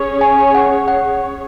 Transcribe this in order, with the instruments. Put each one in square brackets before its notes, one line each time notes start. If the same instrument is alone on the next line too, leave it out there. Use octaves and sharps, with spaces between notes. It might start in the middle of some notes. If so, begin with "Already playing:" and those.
Already playing: [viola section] C#4 G#4 C#5
[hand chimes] G#5
F#5
F#5